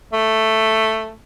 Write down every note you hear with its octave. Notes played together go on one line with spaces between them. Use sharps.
A3